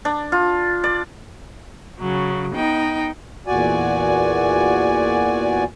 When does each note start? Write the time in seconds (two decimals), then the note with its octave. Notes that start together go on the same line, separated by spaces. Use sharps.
0.05 D4
0.32 F4
0.84 D5
1.98 C#3 F#3
2.55 B3 D#4 G5
3.47 E2 A#2 F#4 D5 G#5